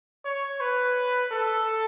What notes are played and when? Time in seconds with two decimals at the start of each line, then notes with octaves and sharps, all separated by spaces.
0.25 C#5
0.60 B4
1.32 A4